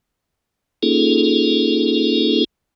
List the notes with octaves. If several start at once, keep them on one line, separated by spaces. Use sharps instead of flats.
A#3 C#4 D#4 F4 G#4 A4